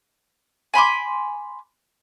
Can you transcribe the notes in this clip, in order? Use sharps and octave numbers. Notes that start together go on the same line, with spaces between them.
G#5 B5 C6 D6